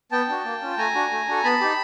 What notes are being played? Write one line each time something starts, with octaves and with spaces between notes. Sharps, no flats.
B3 G5 A5
D4 F#4
A#3
C#4 F4
A3 G#5 A#5
D4 F#4
A3
D4 F#4 A4
B3 A5 B5
D#4 G4